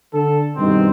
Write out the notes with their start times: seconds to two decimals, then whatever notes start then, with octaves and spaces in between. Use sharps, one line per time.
0.13 D3 A4
0.57 G2 B2 D#3 C4